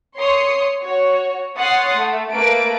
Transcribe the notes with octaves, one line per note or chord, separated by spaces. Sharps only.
C#5 C6 D#6 C7 C#7
F#4 C#5
C#5 F#5 C6 D#6 A6 C7
A3
A3 A#3 B4 D7